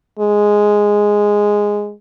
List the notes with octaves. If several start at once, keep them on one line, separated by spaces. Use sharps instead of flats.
G#3